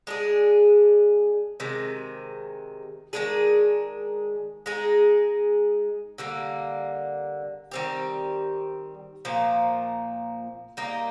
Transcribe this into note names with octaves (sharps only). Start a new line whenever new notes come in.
G#3 D4 G#4
C3 D#3 G#3
D#3 G#3 D4 G#4
G#3 D#4 G#4
D3 G3 A#3
D#3 G3 C4 G4
A#2 F3 A#3
G3 A#3 D#4